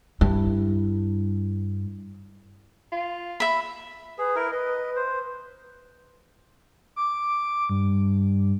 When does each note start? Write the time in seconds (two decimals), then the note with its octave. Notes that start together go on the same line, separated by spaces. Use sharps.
0.21 G2 E4
2.92 F4
3.40 E5 B5
4.18 G#4 B4
4.36 E4 A#4
4.52 B4 D#5
4.96 C5
6.96 D6
7.69 G2